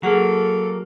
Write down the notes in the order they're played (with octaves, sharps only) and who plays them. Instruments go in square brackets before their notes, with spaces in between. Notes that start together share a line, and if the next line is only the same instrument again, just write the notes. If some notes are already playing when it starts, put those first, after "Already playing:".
[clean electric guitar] F#3 A#3 [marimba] G#4 F#5 [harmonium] A4